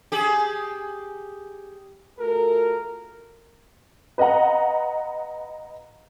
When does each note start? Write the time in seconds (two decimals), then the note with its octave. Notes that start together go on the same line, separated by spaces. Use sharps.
0.12 G4 G#4
2.20 A3 F4 F#4 A4 A#4
4.18 B4 D#5 F5 F#5 A#5